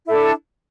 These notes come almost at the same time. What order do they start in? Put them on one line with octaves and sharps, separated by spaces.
E4 A4 D4